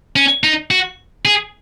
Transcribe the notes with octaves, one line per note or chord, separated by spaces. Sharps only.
C#4
D#4
F#4
G#4